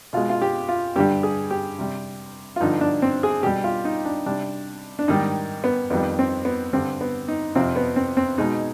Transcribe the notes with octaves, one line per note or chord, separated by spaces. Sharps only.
B2 G#3 F4
F4
G4
F4
G2 D3 G3 G4
G#4
G4
C3 G3
F4
G2 D3 F3 D#4
D4
C4
G#4
B2 G3 G4
F4
D#4
D4
C3 G3 D4
D4
G#2 D#3 G3 D#4
B3
F2 D#3 G3 B3
C4
B3
G2 D3 G3 C4
B3
D#4
F2 C3 F3 C4
B3
C4
C4
B2 G#3 D#4